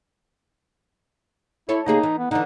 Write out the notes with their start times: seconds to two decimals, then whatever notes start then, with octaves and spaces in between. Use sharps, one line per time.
1.69 E4 A4 C#5
1.86 C#3 A#3 D#4 G#4
2.03 E3
2.18 B3
2.31 D3 E3 D#4